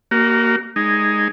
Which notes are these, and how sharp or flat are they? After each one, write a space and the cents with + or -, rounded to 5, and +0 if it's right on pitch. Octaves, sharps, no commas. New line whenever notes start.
A#3 +0 F#4 +40
G#3 +0 D#4 +0